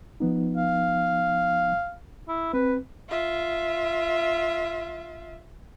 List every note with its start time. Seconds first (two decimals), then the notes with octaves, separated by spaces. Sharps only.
0.20 F3 B3 D#4
0.57 F5
2.28 E4
2.53 C4 B4
3.10 F4 E5